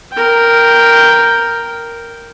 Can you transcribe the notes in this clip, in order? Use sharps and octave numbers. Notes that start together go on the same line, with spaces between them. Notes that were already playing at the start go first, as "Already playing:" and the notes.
A#4 G5